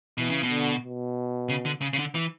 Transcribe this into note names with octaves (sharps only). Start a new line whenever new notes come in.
B2 E3
C#3
B2
D3
B2
C#3
D3
C#3
C#3
D3
E3